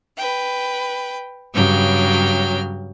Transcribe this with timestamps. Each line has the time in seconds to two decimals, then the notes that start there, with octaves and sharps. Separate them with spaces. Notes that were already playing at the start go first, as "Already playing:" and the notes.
0.16 B4 G5
1.54 G2 C#3 F#3 G5 F6